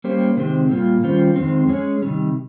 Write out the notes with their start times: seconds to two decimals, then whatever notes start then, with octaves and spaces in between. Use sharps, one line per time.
0.04 G3 A#3 C#4 G4 C5
0.37 C3 D#3 G#3 C4 G4
0.70 A#2 G3 A#3 F4
1.03 D#3 G3 C#4 F4 C5
1.36 F2 D#3 G#3 C4
1.69 G#3 C#4 G#4 C#5
2.02 C3 D#3 G3